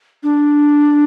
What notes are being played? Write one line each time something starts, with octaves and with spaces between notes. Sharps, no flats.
D4